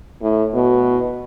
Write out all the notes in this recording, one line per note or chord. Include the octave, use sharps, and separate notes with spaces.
A2
B2